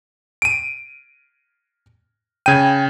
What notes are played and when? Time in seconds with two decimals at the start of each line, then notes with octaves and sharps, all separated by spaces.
0.42 D7 D#7
2.46 C#3 G5 G#6 D#7